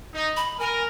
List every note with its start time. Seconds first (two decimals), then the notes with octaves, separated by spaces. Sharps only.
0.14 D#4
0.37 B5
0.59 A#4 G#5